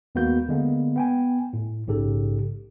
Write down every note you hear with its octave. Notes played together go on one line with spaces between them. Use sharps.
D#2 G#3 A#3 B3 F#4 G6
D3 G#3 A#3 B3
B3 G5 G#5
A2
A#1 G#2 C#3 G4 A4